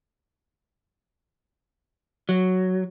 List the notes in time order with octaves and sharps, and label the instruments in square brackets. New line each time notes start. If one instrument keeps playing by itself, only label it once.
[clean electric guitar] F#3